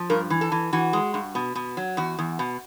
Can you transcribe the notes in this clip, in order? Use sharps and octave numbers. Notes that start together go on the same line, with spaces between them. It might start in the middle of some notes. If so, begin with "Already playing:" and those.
Already playing: F3
G2 A#4
E3
A4
E3
E3 F#4
G#3
G2
B2
B2
F#3
E2 F#4
E2
B2